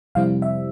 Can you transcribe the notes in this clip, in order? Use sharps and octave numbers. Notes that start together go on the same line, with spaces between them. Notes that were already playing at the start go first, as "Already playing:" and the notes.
F2 C3 G3 C4 E4 F5
E5